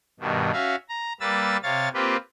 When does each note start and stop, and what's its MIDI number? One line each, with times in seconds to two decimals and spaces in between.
0.20 0.51 43
0.20 0.51 47
0.20 0.51 51
0.53 0.75 61
0.53 0.75 66
0.53 0.75 76
0.53 0.75 77
0.89 1.13 82
1.20 1.57 55
1.20 1.57 58
1.20 1.57 71
1.20 1.57 88
1.20 1.57 93
1.63 1.89 48
1.63 1.89 73
1.63 1.89 77
1.63 1.89 93
1.94 2.16 58
1.94 2.16 60
1.94 2.16 65
1.94 2.16 67
1.94 2.16 71